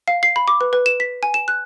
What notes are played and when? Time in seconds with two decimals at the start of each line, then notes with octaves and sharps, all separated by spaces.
0.08 F5
0.23 C7
0.36 B5
0.48 D6
0.61 B4
0.73 B4
0.86 E7
1.00 B6
1.23 G#5
1.34 E7
1.48 F#6